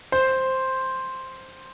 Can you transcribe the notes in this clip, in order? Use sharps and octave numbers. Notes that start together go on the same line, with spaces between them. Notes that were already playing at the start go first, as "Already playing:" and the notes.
C5